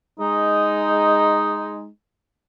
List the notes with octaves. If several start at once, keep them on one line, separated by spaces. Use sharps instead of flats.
G#3 D#4